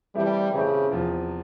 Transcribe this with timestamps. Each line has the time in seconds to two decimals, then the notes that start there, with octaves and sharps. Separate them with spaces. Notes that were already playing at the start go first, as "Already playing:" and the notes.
0.15 E3 G3 A3 C4 E4 G4
0.52 C#3 E3 A3 C4 E4 G4
0.91 E2 C3 F3